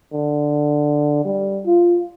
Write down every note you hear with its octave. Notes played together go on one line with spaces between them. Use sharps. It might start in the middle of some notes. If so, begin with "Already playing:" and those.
D3
G3
F4